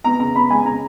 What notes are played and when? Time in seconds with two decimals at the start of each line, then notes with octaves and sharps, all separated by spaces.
0.04 B3 A#5
0.20 C#3 A#5
0.35 B3 B5
0.50 G#3 G#5
0.65 C#3 A#5